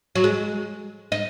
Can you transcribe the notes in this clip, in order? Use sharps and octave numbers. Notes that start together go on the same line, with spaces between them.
F#3
G#3
D#4